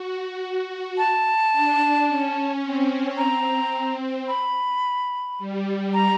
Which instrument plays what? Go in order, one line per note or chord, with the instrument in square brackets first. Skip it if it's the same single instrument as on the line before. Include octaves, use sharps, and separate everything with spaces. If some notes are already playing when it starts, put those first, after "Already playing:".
Already playing: [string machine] F#4
[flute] A5
[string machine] D4
C#4
C4
[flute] A#5
B5
[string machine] G3
[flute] A#5